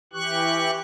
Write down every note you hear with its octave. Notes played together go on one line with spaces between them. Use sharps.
E3 G4 C#6 F#6